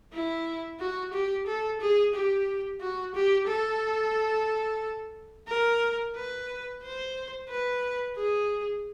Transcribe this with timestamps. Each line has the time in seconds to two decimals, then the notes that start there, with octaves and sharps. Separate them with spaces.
0.13 E4
0.80 F#4
1.13 G4
1.46 A4
1.80 G#4
2.14 G4
2.81 F#4
3.14 G4
3.48 A4
5.48 A#4
6.15 B4
6.83 C5
7.49 B4
8.16 G#4